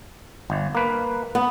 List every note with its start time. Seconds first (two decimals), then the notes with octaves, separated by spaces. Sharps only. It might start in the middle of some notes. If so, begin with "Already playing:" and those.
0.50 G1
0.75 A#3 B4
1.35 B3